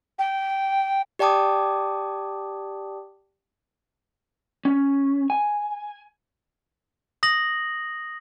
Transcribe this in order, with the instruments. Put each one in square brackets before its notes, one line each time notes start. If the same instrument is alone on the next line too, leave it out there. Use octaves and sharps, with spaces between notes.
[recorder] G5
[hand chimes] G4 D5 G5 A5 D6 D#6
[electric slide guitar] C#4
G#5
[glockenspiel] D#6 A#6 F#7